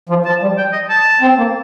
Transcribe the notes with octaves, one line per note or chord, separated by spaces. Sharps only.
F3
F3 A5
G3
G5
D#5
A5
C4
A#3